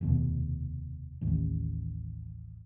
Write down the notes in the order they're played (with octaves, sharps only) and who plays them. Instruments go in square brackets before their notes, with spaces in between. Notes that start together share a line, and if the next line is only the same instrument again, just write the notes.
[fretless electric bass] F1 D#2 B2
A1 D#2